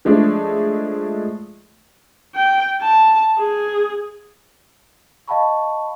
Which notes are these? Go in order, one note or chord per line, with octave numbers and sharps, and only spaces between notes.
F3 G#3 A3 D4
G5
A5
G#4
D#5 F5 G5 A5 B5 C#6